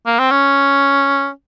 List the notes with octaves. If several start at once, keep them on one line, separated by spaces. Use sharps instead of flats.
A#3
C4
C#4